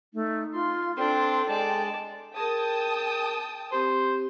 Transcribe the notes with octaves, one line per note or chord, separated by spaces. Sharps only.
A3 D#4
F4 C6
C4 D4 A4 D5 G5 C6
G#3 D5 A5
G#4 A#4 G5 A5 D#6
C4 G4 C5